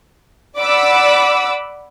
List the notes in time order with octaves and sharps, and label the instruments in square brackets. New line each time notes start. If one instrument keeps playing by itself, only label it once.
[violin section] D5 F#5 B5 D6 E6